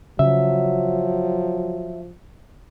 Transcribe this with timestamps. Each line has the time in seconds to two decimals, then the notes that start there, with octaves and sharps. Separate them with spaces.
0.19 C#3 F3 F#3 E5